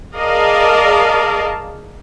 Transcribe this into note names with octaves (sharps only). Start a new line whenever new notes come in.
G#4 A#4 D5 D#5 F5 A5